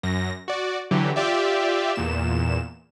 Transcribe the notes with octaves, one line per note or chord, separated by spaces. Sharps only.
F#2 A#6
F#4 D5
D3 E3 F#3 G4
F4 G4 D5 E5
E2 A#2 E7